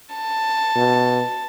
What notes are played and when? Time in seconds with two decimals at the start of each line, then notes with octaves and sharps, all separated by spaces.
0.15 A5
0.76 B2